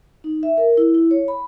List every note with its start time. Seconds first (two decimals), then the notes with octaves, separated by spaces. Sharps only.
0.24 D#4
0.43 E5
0.58 A#4
0.77 E4
0.94 E4
1.11 C#5
1.28 B5